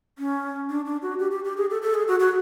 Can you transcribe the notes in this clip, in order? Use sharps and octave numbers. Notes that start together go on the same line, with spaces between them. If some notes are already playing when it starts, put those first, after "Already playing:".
C#4
D4
D4
F#4
G4
G4
G4
G#4
A4
A4
G#4
F#4
F#4